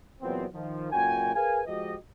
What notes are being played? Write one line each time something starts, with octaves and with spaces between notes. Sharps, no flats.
E2 A#2 F#3 B3 C4
D#3 F3
C#2 F#2 A#2 F#4 G5 G#5
G#4 A#4 B4 F5 G#5
F3 G#3 F#4 G4 D#5